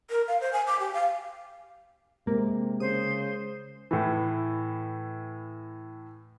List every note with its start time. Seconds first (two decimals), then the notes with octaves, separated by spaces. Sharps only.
0.10 A#4
0.28 F5
0.41 C5
0.53 G#5
0.67 D6
0.80 G4
0.94 F5
2.27 C3 G#3 A#3 A#4
2.80 C#3 C5 D#6
3.91 A2 E3